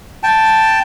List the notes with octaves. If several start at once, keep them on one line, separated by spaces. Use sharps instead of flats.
G5 A5